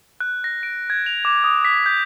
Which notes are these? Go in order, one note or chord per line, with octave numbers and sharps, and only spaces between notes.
F#6
A#6
D7
G#6
F7
D6
D#6
B6
G6